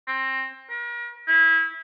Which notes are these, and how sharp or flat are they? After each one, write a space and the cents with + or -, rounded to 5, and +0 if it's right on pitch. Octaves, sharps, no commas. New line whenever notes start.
C4 +20
A#4 +40
E4 -20